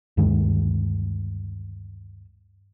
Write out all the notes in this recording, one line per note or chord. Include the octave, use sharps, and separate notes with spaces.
D2 G2 D#3 G#3